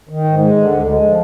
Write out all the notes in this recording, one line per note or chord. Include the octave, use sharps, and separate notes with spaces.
D#3
G#2
G#3
D3
D2
G#3
F3